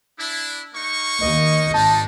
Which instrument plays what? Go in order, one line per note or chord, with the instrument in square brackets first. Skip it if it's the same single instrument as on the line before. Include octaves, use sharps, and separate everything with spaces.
[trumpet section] D4 E4
A#3 D#4 C#6
[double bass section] D#2 [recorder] D#5
[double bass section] G#1 [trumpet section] G3 D4 D#4 [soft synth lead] A5